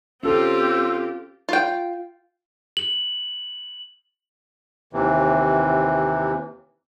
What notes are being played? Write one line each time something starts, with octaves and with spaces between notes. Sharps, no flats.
C4 C#4 F4 G4 A4 E6
F4 G5
F#7
D#2 C3 E3